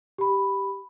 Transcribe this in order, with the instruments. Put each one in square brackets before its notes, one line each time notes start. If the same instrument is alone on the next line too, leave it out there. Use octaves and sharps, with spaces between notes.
[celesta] G4 B5